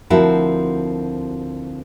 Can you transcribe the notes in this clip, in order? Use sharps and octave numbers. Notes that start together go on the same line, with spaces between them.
D2 F3 C4 E4 F#4 A#4